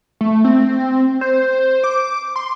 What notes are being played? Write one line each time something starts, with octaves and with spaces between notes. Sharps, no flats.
A3
C4
C5
D6
C6